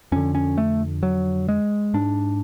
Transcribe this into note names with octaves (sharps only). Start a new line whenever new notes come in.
F2 D3 C#4
C#4
A3
F#3
G#3
G#2 D4